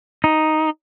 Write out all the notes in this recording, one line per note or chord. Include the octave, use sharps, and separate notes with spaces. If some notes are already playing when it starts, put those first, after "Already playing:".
D#4